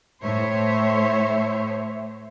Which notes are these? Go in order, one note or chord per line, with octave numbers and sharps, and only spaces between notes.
A2 C5 C#5 E5